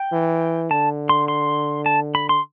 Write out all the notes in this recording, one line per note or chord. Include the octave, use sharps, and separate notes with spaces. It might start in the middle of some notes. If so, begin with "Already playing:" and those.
Already playing: G5
E3
D3 A5
C6
C6
A5
B5
C6